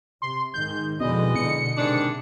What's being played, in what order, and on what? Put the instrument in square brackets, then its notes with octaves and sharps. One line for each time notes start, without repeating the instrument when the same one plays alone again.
[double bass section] C3 [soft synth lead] C6
[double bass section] G#2 D#3 [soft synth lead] G6
[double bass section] F2 D3 [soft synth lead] B2 [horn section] E3 G#3 D#5
[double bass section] B2 D3 [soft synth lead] C#7
[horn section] G#2 D#3 D4 [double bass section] C3